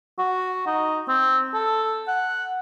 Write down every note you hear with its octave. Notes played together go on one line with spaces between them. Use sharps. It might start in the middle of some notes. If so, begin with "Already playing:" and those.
F#4
D#4
C4
A4
F#5